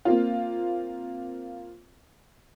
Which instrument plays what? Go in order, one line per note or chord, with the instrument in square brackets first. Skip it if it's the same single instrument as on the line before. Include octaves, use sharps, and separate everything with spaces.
[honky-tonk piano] A#3 C4 F4